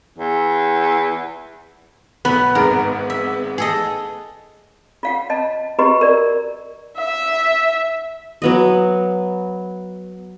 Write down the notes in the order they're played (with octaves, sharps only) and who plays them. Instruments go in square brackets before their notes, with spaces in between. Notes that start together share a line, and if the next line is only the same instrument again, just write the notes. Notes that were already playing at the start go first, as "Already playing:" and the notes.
[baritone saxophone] E2
[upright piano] B1 [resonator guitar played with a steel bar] B3 [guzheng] B4
[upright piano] G#1 G#2 D7 [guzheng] A#4
[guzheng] E5
G#4 A4 D#5
[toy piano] F4 F5 F#5
D#5 A5
F#4 G4 B4 D#5 A#5
A#4 D5
[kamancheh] E5
[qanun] F#3 B3 D#5